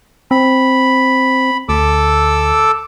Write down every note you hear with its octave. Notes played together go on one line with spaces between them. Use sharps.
C4 B5
D2 A4 D6 E6